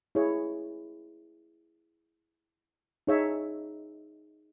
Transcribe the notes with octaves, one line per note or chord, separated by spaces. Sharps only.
E4 G#4 C#5
D#4 G#4 C#5 E5